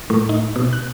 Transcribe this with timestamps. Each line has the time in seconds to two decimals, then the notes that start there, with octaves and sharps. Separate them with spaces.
0.10 A2
0.29 D#4
0.56 B2
0.73 F#6